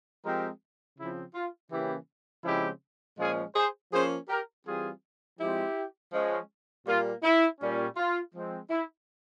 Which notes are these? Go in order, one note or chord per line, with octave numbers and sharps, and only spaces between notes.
F3 G#3 C4 G4 A#4
C#3 F3 C4 E4
F4
C#3 E3 A#3 C#4 E4 G4
C#3 F3 G#3 C4 E4 G4
A#2 F3 G#3 C#4 F4 G#4
G#4 C5
F3 A#3 C#4 G#4 C5
G4 A#4
E3 G3 C4 F4 G#4
F3 G#3 C4 E4 G4
F3 G#3 C#4
A#2 G3 A#3 F4
E4
A#2 G3 C#4
F4
F3 G#3 C4
E4